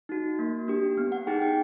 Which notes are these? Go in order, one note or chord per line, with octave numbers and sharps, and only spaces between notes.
D#4 F#4
A#3
D4 G4
B3
F#5
D#4 G#4 G5
G5